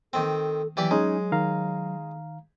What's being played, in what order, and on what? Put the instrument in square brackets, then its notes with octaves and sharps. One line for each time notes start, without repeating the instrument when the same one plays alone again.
[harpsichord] D#3 C4 [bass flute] A4
[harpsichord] E3 G4 D5 [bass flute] F#3
[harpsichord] G#3 [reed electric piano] C#4 D#4 G#5
[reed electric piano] D#3 F5 A#5